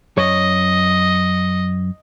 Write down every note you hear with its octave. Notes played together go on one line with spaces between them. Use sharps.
F#2 C#5 D#5